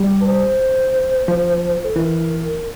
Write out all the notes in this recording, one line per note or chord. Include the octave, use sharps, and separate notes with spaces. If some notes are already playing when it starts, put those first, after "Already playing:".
Already playing: G3
B4
C5
F3
A4
E3 A#4